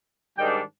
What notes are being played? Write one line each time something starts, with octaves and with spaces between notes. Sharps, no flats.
G#2 D#3 G3 D4 G5